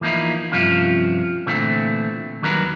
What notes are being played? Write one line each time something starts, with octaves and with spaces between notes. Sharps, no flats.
E3 F3 A#3 D#4 E4
G2 C3 F3 C#4 F4
A#2 D3 E3 A3 C4
D#2 D#3 F#3 G3 A#4 B4